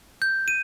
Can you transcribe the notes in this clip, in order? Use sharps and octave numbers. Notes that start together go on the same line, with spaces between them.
G6
D#7